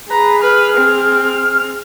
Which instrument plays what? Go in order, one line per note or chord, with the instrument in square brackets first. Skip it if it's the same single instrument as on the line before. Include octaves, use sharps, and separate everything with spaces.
[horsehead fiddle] G#4 [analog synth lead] B4 [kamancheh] A#5
[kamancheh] B4 [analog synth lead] F6
[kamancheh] C4